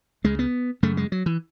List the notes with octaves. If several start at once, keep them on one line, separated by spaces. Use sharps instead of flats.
C#2 C#3 G#3
B3
F#2 C#3 A3
G#3
F#3
E3